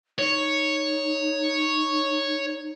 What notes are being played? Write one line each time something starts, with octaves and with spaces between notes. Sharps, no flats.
D#4 C#5